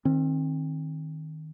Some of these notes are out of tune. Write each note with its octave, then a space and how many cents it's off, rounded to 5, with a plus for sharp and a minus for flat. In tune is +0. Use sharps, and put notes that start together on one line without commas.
D#3 +0 C4 +30